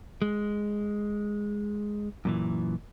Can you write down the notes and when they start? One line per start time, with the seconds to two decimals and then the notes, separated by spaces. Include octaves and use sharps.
0.22 G#3
2.25 F#2 A#2 E3